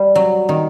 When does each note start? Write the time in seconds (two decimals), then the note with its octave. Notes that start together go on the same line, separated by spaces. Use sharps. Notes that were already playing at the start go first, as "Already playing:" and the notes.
Already playing: G3
0.16 F#3
0.49 D#3